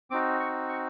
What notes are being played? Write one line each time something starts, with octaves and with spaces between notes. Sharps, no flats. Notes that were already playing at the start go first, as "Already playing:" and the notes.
C4 D#4 F#4 D6
C#6
C#6